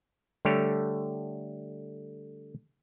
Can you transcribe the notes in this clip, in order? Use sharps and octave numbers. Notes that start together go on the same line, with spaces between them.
D3 G3 A3 G4 C#5